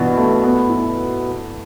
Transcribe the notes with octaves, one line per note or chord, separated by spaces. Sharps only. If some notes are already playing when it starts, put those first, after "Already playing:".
Already playing: G2 B2 E3
A3
B3
E4